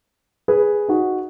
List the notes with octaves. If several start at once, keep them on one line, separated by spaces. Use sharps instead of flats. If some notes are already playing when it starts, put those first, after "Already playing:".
G#4 B4
D#4 F#4